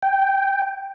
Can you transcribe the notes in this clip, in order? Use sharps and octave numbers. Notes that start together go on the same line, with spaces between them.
G5